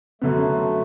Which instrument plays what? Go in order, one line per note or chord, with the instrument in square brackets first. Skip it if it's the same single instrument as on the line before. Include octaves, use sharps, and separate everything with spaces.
[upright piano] F#2 D3 B3 [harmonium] A3